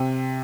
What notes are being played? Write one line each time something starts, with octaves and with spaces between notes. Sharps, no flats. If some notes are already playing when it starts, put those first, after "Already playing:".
Already playing: C3